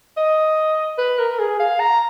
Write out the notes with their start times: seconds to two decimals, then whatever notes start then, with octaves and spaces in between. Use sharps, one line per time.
0.17 D#5
0.98 B4
1.19 A#4
1.39 G#4
1.60 F5
1.80 A#5